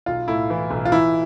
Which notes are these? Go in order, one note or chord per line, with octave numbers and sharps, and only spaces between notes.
B1 F4
A2 E4
E3
B1
F4
E3 E4